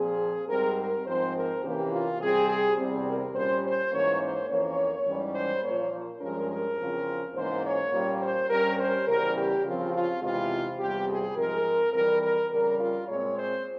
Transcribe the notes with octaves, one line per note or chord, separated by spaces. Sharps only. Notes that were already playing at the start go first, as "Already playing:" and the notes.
Already playing: A#2 F3 C4 G#4
G#2 G3 C4 A#4
A#4
G#2 F3 C4 C5
A#4
C3 E3 A#3 C#4 G4
F4
C3 G3 C4 G#4
G#4
E2 C3 G3 C4
A#4
A#2 G3 C#4 C5
C5
G#2 E3 A#3 C#4 C#5
C5
F2 E3 A#3 C#4 C#5
G#2 E3 G3 C#4
C5
A#2 F3 A#3 C#5
G2 F3 G#3 C#4 A#4
A#4
E2 C#3 F3 C4
G#2 E3 A#3 C#4 C5
C#5
A#2 G3 A#3 C#4
C5
G2 G3 C#4 A#4
C5
E2 C#3 E3 G3 A#4
G4
C#3 F3 C4 F4
F4
E2 C3 E3 G#3 C4 F4
E2 C3 G3 C4 G4
G#4
G#2 F3 G#3 C4 A#4
F2 E3 G3 C4 A#4
A#4
F2 C#3 G3 A#4
F4
A#2 G#3 C4 C#5
C5